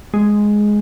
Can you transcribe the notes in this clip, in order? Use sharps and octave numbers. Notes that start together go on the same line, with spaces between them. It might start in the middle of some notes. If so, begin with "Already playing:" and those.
G#3